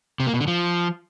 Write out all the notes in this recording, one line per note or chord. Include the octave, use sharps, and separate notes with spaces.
C3
A#3
B2
D3
F3